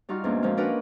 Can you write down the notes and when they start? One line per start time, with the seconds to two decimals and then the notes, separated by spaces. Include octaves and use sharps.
0.09 G3 D#4 F4 F#4 F6
0.24 E2 G#2 A#3 C#4 D4
0.42 A#2 F3 G#3 C4 D#4 F4
0.57 A#3 C#4 D4 F#4 A#4 B4